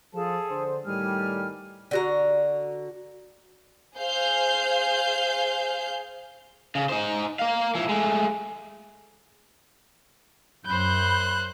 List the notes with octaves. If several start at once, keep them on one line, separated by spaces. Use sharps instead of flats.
F3 G#4 A4 A5
D3 C5
A2 D#3 G3 G#5 F6
D3 F#4 A#5
G#4 C5 F5 G6
C#3
D#4 C5
A#4 F5
F3 E4
G#3 A3
F#2 C5 B5 F#6 G6